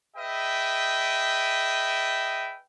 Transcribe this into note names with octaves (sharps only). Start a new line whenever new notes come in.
G#4 B4 D#5 E5 G5